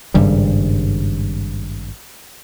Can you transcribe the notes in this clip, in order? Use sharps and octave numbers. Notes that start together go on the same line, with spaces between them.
G#1 G2 C#3 G3